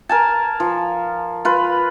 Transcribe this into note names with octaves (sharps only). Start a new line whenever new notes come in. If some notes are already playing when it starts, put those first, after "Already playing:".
A#4 G#5 A5
F3
F4 B4